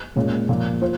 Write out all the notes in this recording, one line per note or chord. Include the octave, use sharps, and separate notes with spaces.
A#2 G#3 C#4
A#2 F3 A#3
F4 C5